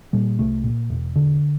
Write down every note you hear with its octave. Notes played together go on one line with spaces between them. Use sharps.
A#2 G3
C2 A3
A#2
E1
D3